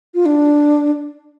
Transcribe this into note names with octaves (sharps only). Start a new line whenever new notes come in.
F4
D4